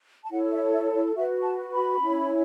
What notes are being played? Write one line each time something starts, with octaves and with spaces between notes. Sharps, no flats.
A5
E4 A4 C#5 F#5
E5
E5
C#5
F#4 B4 E5
A5
B5
C#4 E4 C#5